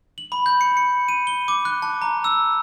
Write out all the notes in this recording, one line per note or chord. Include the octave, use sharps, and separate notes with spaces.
F#7
B5
G6
C#7
C#7
D#7
G7
D6
F#6
A5
A#5
E6